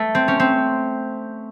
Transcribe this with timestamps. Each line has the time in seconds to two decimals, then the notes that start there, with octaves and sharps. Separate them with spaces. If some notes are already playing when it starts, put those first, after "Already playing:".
Already playing: A3
0.15 C4
0.28 C#4
0.40 C4